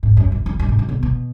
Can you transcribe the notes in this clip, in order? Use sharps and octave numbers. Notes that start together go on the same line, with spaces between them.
G#2
F#2
F#2
F2
F#2
G#2
F#2
B2
B2